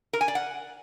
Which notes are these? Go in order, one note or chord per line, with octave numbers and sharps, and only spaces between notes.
A#4
G#5
D5
F#5